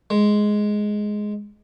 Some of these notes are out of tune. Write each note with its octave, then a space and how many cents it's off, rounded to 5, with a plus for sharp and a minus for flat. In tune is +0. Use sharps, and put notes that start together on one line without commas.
G#3 +5